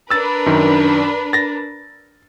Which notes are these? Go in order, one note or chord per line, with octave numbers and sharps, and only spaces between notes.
D4 A#4 B4 E6 A6
F#2 D#3
A6 A#6